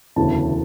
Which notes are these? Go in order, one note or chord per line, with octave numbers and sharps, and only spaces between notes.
E1 D2 C#3 E3 A5